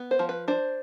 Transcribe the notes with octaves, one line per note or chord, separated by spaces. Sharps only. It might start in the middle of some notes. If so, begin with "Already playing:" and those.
Already playing: B3
C5
F3
B4
D4 C5